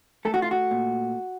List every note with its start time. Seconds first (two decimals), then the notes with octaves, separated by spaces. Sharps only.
0.25 A3 A4
0.34 F#4
0.42 F4
0.51 F#4
0.71 A#2